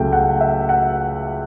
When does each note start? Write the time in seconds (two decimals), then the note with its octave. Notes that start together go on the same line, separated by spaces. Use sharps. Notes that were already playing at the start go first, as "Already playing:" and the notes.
Already playing: C#2 C#3 F#3 A3 G5
0.13 F#5
0.41 E5
0.69 F#5